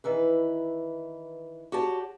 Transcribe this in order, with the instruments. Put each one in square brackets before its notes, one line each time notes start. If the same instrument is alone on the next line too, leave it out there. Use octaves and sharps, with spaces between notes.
[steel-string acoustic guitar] D#3 E3 B4
F#4 G4 C#5 A5